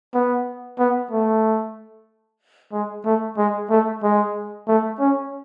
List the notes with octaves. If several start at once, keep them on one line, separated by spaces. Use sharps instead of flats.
B3
B3
A3
G#3
A3
G#3
A3
G#3
A3
C#4